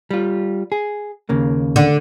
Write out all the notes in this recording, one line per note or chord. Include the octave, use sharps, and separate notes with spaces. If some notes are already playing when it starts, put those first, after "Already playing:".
G3 F4
G#4
D#2 C#3 A#3
D3